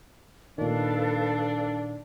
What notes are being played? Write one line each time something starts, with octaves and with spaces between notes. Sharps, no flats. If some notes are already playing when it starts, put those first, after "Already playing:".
A#2 D#3 D4 A4 B4 F5